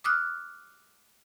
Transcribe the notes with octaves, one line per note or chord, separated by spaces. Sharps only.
D6 D#6 F6 F#6